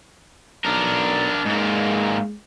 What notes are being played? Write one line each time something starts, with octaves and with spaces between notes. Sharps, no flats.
B1 D4 A#4
G#2 G#3 A#3